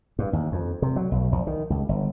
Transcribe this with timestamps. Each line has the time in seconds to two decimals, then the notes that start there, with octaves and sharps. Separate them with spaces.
0.19 G2
0.33 D#2
0.52 F2
0.82 C3
0.96 F#3
1.12 B1
1.32 A#1
1.47 D#3
1.70 C#2
1.89 G1